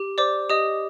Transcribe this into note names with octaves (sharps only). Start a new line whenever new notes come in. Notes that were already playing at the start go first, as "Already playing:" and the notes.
Already playing: G4
C5 D5 D6
G4 D#5 D#6